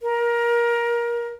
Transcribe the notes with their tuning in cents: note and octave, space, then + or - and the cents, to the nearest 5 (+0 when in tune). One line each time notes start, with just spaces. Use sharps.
A#4 +20